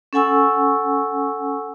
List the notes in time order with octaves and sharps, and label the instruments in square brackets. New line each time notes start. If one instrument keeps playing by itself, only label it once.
[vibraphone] C#4 A4 F#5 G#5 C#6 E6